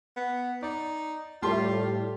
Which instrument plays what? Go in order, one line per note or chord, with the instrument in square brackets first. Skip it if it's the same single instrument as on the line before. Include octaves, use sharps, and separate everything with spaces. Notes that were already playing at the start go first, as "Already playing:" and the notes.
[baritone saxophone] B3
[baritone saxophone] D#4 [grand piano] D5
[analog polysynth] A2 G3 A3 [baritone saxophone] F4 [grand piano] G4 A5 C6